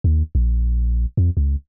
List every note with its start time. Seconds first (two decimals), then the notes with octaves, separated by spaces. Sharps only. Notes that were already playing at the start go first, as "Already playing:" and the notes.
0.04 D#2
0.35 A#1
1.17 F2
1.37 C#2